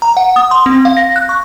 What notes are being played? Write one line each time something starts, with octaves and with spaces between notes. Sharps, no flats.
A#5
F#5
D#6
C6
C4
F5
A#6
F#6
C#6